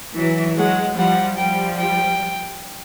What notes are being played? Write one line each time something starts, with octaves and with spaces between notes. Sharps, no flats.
E3 F#3
F#3 G#3 F#5
F3 G3 F#5
F3 G3 G5
G5